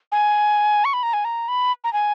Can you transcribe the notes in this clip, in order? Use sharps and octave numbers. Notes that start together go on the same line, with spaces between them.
G#5
C#6
B5
A#5
G#5
A#5
B5
A#5
G#5